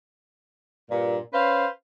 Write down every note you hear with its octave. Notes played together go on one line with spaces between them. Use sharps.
G2 A#2
C#4 B4 C5 F5